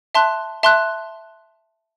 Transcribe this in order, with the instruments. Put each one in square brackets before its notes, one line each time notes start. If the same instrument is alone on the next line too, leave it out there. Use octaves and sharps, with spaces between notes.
[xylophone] E5 A5 C6 F#6
E5 A5 C6 F#6